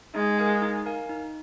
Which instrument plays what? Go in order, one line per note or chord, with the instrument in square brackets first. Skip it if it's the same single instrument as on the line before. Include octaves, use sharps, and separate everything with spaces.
[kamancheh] G#3 [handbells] D#4
[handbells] A#4 F5 G#5
D#4
A#4 F5 G#5
D#4